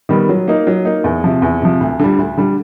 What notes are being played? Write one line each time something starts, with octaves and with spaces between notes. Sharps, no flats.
D#3 G3 B3
F#3
A#3 D#4
F#3
A#3 D#4
E2
C3 F3
E2
C3 F3
D2
D3 G3
D2
D3 G3